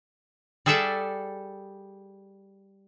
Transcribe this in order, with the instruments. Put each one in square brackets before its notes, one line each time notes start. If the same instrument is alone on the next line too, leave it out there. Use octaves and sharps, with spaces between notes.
[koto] G3 G#4 A4 D5 E5 F#5